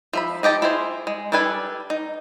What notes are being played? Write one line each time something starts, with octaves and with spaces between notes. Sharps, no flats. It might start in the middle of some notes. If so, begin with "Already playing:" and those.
F3 E5 B5
D#4 G4 D#5 A5
E4 F4 G#4 C5
G#3
G3 D4 A4 B4 G#5
D#4